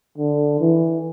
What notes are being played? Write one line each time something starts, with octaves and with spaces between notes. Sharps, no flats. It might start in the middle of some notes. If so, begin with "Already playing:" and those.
D3
E3